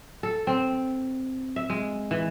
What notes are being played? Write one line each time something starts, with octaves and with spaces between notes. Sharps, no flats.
A4
C4
E5
G#3
E3